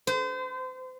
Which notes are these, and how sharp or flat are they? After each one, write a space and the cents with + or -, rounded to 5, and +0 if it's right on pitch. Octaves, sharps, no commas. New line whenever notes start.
C5 -35